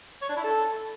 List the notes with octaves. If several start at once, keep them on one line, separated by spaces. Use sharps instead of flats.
C#5
D4
E4
A4